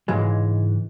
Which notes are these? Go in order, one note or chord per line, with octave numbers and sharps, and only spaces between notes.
C#2 G#2 E3 G#3